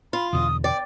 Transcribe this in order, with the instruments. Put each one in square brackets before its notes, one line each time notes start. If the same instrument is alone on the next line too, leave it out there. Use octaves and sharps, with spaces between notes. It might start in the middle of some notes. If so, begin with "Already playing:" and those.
[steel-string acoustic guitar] F4 [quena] B5
[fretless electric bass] E2 B2 D3 [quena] D#6
[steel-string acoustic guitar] D5 [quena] G5